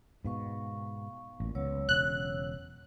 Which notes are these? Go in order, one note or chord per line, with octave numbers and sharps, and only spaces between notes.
G#2 B2 B3 F5 C#6
A1 A#2
C#2 F#3 B3 C#5 E6
E1 C#3 F#6